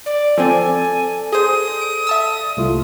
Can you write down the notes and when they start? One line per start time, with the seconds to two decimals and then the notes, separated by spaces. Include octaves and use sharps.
0.06 D5
0.38 F3 C4 A4 D5 G#5
1.32 G#4 C5 D#6
1.81 D7
2.07 E5 A5 E6
2.57 C2 A3 F4